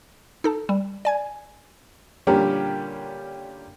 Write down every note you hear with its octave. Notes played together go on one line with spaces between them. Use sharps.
D#4 A4 A5
G3
D5 G#5 G#6
A#2 D3 G3 C#4 G4 A#4